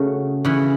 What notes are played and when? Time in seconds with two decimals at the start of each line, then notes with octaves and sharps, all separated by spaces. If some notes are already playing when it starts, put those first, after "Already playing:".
Already playing: C#3 A3 F#4
0.45 C#3 E3 C#4